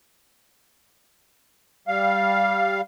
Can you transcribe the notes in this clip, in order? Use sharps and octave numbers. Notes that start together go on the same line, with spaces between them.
G3 F5